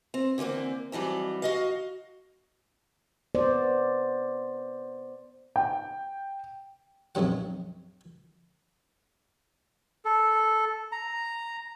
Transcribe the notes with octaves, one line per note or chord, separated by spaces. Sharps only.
C4
D3 E3 A3 A#3 C4
F2 E3 F#3 G3
F#4 D#5 F5
B3 C5 D5
G5
A#1 F#2 C3 F#3 F#5
A4
A#5